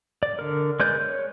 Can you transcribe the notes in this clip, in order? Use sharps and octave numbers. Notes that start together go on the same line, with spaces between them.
D5
D3 A#4
G#3 A#4 B4 D5 G6
C#5